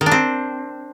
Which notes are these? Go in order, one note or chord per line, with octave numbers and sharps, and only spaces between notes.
D#3
D4
C4